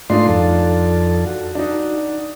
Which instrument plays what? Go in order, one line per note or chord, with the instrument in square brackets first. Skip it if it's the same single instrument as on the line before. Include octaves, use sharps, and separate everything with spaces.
[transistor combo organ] G#2 A3 C6 [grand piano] D4 D#4 F4
[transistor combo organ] F2 A4
F#4
[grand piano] D4 D#4